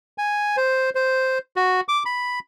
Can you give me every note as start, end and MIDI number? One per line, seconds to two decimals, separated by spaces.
0.18 0.56 80
0.57 0.90 72
0.95 1.38 72
1.56 1.81 66
1.89 2.03 86
2.06 2.39 83